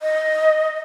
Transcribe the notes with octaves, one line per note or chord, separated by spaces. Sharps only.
D#5